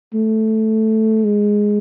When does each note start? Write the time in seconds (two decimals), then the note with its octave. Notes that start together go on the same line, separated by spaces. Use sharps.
0.14 A3
1.24 G#3